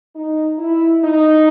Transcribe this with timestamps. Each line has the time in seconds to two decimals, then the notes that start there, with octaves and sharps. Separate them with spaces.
0.15 D#4
0.59 E4
1.03 D#4